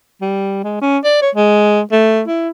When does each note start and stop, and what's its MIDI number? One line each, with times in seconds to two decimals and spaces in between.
0.21 0.61 55
0.64 0.77 56
0.81 0.98 61
1.04 1.18 74
1.22 1.30 73
1.35 1.81 56
1.92 2.23 57
2.28 2.49 64